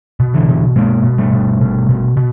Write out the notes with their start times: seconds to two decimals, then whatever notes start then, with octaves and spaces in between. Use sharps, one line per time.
0.20 B2
0.34 D3 E3
0.49 B2
0.76 B2 G#3 A#3
1.04 B2
1.18 G3 A3
1.33 B2
1.61 B2
1.89 B2
2.17 B2